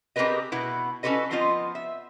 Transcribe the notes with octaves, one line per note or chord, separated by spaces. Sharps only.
C4 G4 G#4 A#4 B4 D#5
B2 B3 E4
C#4 F#4 G#4 A4 B4 D#5
F3 B3 C4 F4 D#5
E5